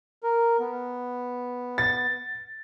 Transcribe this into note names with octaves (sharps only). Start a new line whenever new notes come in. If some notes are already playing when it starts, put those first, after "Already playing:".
A#4
B3
A6